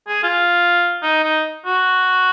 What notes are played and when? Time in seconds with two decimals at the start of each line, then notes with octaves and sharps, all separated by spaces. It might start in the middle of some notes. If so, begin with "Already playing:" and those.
0.08 G#4
0.23 F4
1.02 D#4
1.23 D#4
1.66 F#4